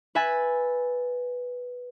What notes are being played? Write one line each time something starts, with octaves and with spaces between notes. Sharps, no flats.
B4 E5 G#5 B5 A6